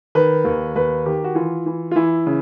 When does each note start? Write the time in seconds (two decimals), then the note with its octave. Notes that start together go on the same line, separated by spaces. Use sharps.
0.15 D#3 B4
0.45 D#2
0.76 D#2 B4
1.06 D#3 G4
1.24 F#4
1.35 E3 F4
1.66 E3
1.91 F4
1.96 E3 E4
2.27 C#3